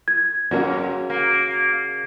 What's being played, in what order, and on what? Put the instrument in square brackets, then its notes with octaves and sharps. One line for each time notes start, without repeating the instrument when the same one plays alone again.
[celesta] G#6
[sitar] F#2 [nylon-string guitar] C#3 F#4 A#4
[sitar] A#3